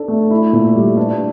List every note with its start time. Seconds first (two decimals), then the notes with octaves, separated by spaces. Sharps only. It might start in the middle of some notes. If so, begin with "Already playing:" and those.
Already playing: D4 A4
0.08 A3
0.30 E4
0.53 A#2
0.75 G3
0.97 D4